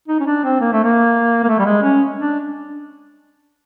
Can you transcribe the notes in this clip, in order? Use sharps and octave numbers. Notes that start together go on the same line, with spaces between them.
D#4
C#4
D4
C4
A#3
A3
A#3
A#3
A3
G3
G#3
C#4
D4